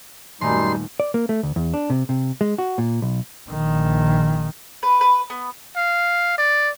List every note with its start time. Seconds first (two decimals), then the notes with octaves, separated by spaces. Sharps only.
0.41 D#1 F#2 G3 A3 D#4 G#5 C6
1.00 D5
1.14 A#3
1.29 A3
1.43 D2
1.56 E2
1.74 D4
1.90 C3
2.09 C3
2.41 G#3
2.58 F#4
2.78 A#2
3.02 B1
3.49 A#1 D#3
4.83 B4
5.01 B4
5.30 B3
5.76 F5
6.38 D5